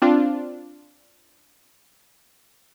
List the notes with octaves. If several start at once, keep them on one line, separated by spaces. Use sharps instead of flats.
C4 D4 F4